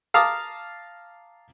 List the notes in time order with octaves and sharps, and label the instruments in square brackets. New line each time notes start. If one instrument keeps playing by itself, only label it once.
[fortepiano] F5 A5 A#5 D6 D#6